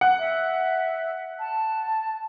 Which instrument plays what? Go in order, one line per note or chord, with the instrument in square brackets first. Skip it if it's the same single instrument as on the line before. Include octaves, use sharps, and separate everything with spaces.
[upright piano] F#5
[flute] E5
A5